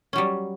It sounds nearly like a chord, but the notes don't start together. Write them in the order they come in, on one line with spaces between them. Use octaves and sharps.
C#4 F#3 G3